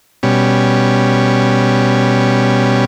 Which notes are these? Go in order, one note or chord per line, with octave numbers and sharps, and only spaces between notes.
B2 G3 C#4